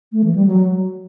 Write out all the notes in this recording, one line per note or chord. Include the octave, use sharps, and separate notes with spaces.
A3
E3
G3
F#3